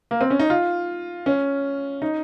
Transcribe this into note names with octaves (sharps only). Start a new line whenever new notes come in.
A#3
C4
C#4
D#4
F4
C#4
D#4